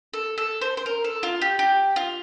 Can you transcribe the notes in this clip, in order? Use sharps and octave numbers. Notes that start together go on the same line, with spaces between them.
A4
A4
C5
C5
A#4
A4
F4
G4
G4
F4